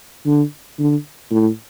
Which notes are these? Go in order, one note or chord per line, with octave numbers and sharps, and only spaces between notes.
D3
D3
A2